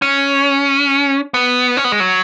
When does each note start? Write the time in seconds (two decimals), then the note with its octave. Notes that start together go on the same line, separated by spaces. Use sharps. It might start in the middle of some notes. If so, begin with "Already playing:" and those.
0.02 C#4
1.34 B3
1.77 C#4
1.84 B3
1.92 G#3
2.00 F#3